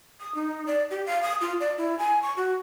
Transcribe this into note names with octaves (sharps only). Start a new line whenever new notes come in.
D#6
D#4
D5
G4
F5
D#6
F4
D5
E4
G#5
C#6
F#4